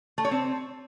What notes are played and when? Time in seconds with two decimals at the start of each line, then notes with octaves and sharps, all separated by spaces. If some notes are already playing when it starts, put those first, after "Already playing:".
0.18 A3
0.25 C#5
0.31 C4